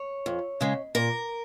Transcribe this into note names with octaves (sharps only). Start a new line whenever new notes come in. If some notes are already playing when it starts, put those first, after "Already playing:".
Already playing: C#5
F2
C#3 G#3
A#2 A#4